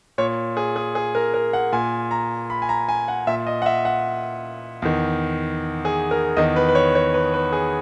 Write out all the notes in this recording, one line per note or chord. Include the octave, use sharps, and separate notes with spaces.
A#2 C#5
G#4
G#4
G#4
A#4
A#4
F#5
A#2 G#5
A#5
B5
G#5
A#5
G#5
F#5
A#2 E5
D#5
F#5
E5
F#5
E2 D#3
G#4
A#4
E2 D#3 D#5
B4
B4
C#5
C#5
B4
B4
G#4